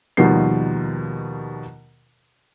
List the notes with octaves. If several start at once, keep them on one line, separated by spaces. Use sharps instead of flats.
D#2 B2 D#3 F3 G3 C7